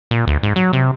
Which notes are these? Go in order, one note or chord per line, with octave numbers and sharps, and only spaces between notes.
A#2
D2
G#2
F#3
C3